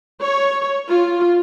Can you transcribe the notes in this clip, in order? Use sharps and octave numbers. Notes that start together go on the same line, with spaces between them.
C#5
F4